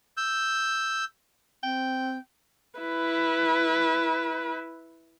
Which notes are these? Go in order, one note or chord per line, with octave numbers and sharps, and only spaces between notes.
E6 G6
C4 G5
E4 B4